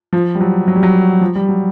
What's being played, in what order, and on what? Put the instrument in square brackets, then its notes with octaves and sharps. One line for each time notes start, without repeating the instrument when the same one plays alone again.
[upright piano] F3
G3
F#3
F#3
G3
F#3
F3
G3
F#3